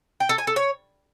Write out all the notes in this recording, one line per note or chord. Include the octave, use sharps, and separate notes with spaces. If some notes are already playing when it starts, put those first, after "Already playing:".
G5
A4
G#5
A4
C#5